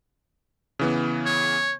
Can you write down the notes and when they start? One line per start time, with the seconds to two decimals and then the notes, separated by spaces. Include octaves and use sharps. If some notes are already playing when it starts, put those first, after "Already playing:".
0.79 C#3 E3 B3
1.25 C#5